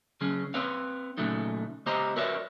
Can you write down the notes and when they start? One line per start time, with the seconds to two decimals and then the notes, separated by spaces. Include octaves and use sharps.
0.21 C#3 F#3 C#4 G#4
0.54 C4 B4 C#5 F5
1.17 A#2 C#3 F#3 A3 D#4
1.86 C#2 B3 G4 C5 D#5 A#5
2.16 F#4 A#4 B4 C#5 D5 E5